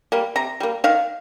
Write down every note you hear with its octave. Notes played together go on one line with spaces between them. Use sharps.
G3 A#3
C3 A#5
G3 A#3
D#3 F5